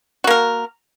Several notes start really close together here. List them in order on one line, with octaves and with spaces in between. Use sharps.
F#4 A#3 A#4